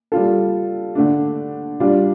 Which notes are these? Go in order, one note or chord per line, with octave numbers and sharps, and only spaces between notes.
G3 F4 A4
D3 A3 D4
G3 D4 F4